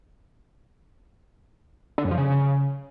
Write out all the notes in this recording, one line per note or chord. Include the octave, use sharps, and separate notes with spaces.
D3
F#2
F3
C#3